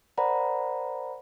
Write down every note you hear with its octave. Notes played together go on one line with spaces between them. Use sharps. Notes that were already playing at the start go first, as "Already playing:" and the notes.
A#4 C5 D5 F#5 A#5 B5